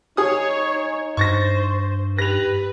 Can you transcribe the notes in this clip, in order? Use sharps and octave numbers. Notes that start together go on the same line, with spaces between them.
D#4 G#4 C#5 D#6
G2 C5 C#6 A6 A#6
G4 B4 A#6 F7